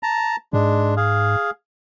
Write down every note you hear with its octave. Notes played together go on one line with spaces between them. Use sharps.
A5 A#5
G#2 G#3 D4
G#4 F5